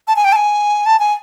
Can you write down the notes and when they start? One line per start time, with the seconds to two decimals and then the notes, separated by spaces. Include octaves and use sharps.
0.08 A5
0.16 G#5
0.24 G5
0.32 A5
0.36 G#5
0.86 A5
0.99 G#5